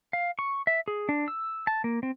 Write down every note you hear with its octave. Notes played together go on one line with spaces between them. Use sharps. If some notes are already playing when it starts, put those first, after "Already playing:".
F5
C#6
E5
G#4
D4
E6
A5
A#3
C4